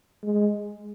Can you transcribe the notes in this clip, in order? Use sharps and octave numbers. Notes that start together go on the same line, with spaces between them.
G#3